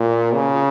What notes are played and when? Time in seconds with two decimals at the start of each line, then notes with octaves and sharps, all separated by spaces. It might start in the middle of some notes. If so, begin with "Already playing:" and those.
Already playing: A#2
0.34 C#3